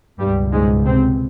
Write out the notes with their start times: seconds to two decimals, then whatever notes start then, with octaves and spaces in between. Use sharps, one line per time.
0.19 C#2 G2 B2 G3
0.52 G#2 G#3
0.85 C3 C4